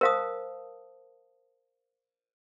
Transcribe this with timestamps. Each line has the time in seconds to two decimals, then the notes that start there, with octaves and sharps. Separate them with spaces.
0.01 A#4 C5 F5 A5 D#6